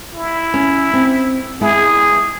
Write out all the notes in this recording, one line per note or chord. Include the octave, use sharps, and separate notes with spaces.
E4
C#4
C4
G#3 B3 E4 G#4